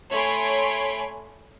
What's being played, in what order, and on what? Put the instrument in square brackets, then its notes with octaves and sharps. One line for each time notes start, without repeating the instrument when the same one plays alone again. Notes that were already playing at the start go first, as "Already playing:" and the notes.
[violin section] A3 C#5 G#5 B5 C6 D7